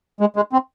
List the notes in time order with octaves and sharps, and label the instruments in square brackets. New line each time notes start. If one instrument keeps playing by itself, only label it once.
[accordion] G#3
G#3
C4